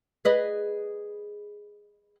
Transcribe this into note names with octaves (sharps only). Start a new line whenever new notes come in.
G#4 B4 D#5